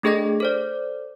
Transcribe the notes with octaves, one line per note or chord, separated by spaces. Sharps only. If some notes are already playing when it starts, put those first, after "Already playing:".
A3 D4 G#4 A4 D#5 A#6
A4 C5 D5